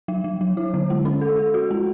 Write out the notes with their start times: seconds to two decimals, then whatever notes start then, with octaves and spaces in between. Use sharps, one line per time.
0.08 F#3
0.24 F#3
0.41 F#3
0.57 E4
0.74 D3
0.90 G#3
1.05 C#4
1.21 A4
1.39 A4
1.54 F#4
1.71 G#3